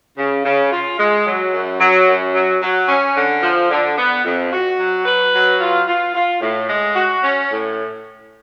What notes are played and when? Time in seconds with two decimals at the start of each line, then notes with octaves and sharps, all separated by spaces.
0.17 C#3
0.45 C#3
0.72 F4
0.98 G#3
1.25 F#3
1.53 F#2
1.79 F#3
2.07 F#2
2.35 F#3
2.61 F#3
2.89 C#4
3.15 D3
3.43 F3
3.71 D3
3.98 B3
4.25 F2
4.52 F#4
4.78 F#3
5.05 B4
5.33 F#3
5.60 F4
5.87 F4
6.15 F4
6.41 A2
6.68 G#3
6.95 F#4
7.23 C#4
7.50 A2